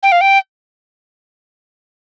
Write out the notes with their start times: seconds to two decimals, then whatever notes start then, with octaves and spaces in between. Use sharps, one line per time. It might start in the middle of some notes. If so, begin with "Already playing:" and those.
0.03 G5
0.12 F5
0.21 G5